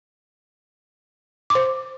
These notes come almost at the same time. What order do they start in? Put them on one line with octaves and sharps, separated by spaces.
D6 C6 C5